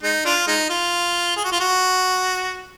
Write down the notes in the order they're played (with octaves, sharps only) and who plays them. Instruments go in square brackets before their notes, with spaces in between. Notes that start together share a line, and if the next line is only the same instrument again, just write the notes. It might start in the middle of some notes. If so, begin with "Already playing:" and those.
[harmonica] G#3 D#4
D4 F4
G#3 D#4
F4
G#4
F#4
F4
F#4